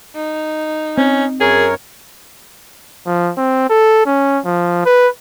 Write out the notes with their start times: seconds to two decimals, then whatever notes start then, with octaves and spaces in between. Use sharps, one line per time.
0.16 D#4
0.98 C4 C#4
1.41 F#2 G#4 A#4 C#5
3.06 F3
3.37 C4
3.70 A4
4.06 C#4
4.45 F3
4.86 B4